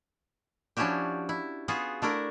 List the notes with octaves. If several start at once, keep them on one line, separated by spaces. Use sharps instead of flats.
F3 C#4 D4 E4 F#4 G4
E4
B3 F4 F#4 G#4
A3 D4 E4 A#4